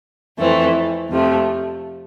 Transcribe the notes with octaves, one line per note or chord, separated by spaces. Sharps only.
F2 E3 A3 C4
F2 C3 F3 A3